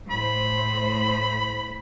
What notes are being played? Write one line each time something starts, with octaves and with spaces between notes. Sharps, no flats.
A2 C5 B5